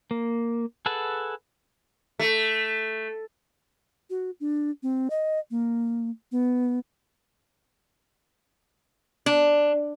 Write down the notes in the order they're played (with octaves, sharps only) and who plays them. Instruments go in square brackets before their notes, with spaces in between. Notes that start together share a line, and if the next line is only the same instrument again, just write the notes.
[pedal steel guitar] A#3
G#4 A4 B4 F#5 A5
[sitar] A3
[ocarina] F#4
D4
C4
D#5
A#3
B3
[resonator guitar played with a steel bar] D4